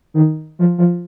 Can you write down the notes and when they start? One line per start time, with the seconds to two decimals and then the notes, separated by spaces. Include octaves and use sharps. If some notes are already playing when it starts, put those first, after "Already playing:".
0.14 D#3
0.59 F3
0.78 F3